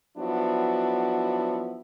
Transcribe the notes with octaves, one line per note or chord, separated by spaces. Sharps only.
F3 F#3 B3 D4 E4 F#4